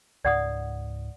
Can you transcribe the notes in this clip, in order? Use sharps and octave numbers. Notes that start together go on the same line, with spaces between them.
C#2 G#2 D5 F#5 D#6